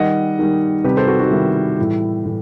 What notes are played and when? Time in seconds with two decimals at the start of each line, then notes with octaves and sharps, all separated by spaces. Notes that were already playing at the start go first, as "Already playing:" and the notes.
Already playing: D#3 G3 D#5 F#5
0.39 D#3 G3
0.84 C3 D#3 G3 G4 B4
0.97 A4 C5
1.08 F#4 A4
1.19 D#4 F#4
1.31 C3 D#3 G3 E4
1.79 A2 E3 G3
2.26 A2 E3